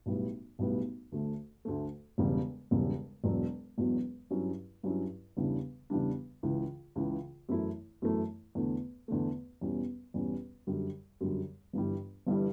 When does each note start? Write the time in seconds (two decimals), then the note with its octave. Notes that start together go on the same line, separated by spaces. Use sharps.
0.06 B1 A2 G3 B3
0.59 B1 A2 G3 B3
1.12 D2 D3 A3
1.65 D2 D3 A3
2.18 E1 E2 C#3 G3
2.71 E1 E2 C#3 G3
3.24 E1 E2 B2 F#3
3.78 E1 E2 B2 F#3
4.30 G2 F#3 C#4 E4
4.83 G2 F#3 C#4 E4
5.37 E2 C#3 E3 G3 D4
5.90 E2 C#3 E3 G3 D4
6.43 C#2 C#3 E3
6.96 C#2 C#3 E3
7.49 F#2 E3 A3 E4
8.02 F#2 E3 A3 E4
8.55 E2 D3 A3
9.08 E2 D3 A3
9.61 E2 B2 G3 C#4
10.14 E2 B2 G3 C#4
10.67 F#2 D3 G3
11.21 F#2 D3 G3
11.73 G1 G2 E3 G3
12.27 G1 G2 E3 G3